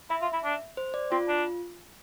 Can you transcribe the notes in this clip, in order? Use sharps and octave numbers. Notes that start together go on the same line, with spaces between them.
E4 E5
F4
E4
D4
C5
D5
C4 F4
D4